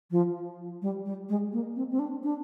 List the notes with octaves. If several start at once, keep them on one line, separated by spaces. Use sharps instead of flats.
F3
G3
G3
G#3
A#3
C4
C4
D4
D4